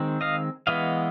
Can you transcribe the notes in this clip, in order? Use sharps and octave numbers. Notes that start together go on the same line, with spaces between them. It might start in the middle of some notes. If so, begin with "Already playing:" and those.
Already playing: D#3 G#3 C4
D#5 F5
E3 G#3 B3 D#5 F5